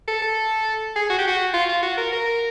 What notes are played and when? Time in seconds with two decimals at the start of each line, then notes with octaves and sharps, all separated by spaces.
0.08 A4
0.22 A4
0.96 G#4
1.10 F#4
1.19 G4
1.27 F#4
1.54 F4
1.69 F4
1.83 F#4
1.98 A#4
2.13 A#4